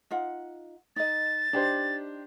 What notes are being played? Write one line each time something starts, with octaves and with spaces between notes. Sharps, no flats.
D#4 F4 F#5
D#4 D#5 A6
D4 D#4 G4 C5